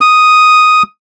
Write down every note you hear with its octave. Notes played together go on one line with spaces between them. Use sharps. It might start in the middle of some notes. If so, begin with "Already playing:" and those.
D#6